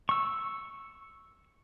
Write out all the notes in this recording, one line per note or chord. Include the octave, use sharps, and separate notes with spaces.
C#6 E6